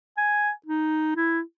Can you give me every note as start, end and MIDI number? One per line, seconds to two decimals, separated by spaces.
0.17 0.51 80
0.66 1.13 63
1.16 1.41 64